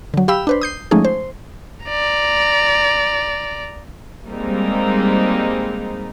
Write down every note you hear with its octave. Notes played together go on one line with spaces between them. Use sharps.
D3 F#3
G4 F5 G5 B5 E6
D4 B4 C5
D#6 G6 C7
F3 G#3 A3 C#4 D#4 G#4
C5
D5 A#5
G3 G#3 A#3 C4 D#4